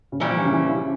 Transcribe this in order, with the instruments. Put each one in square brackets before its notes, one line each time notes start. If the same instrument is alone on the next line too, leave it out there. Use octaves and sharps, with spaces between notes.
[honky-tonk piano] C#3
[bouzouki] A#2 G3 C#4 E4 [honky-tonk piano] E3
[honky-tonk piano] F3
E3
C#3
E3
E3